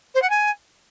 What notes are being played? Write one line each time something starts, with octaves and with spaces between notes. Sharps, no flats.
C5
F#5
G#5